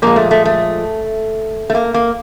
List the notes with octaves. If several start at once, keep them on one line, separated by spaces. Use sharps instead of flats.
A#2 F3 G#3 A#3
A3
A3
A3
A3
A#3
A#3